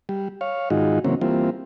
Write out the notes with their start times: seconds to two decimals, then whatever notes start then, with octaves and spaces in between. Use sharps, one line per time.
0.09 G3
0.41 C#5 F5
0.70 G#2 D#3 G#3 D#4 F4 F#4
1.05 C#3 E3 F#3 A#3 C4 C#4
1.21 E3 G3 A#3 C4 F4